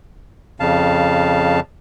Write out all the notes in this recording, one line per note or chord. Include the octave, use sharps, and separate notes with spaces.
F2 C#3 F5 A5